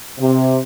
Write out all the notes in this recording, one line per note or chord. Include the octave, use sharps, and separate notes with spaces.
C3